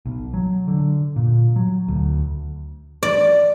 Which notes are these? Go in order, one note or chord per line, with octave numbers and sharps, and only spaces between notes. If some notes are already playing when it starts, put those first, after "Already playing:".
B1
F#3
D3
A#2
F#3
D2
D5